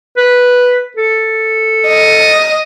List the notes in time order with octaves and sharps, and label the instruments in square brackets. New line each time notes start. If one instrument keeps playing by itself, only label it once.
[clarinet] B4
A4
[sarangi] D#5